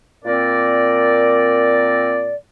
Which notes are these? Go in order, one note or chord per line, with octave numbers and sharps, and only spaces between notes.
A#2 C4 A#4 D5